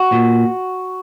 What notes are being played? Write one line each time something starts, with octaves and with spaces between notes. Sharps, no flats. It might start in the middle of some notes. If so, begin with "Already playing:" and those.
Already playing: F#4
A#2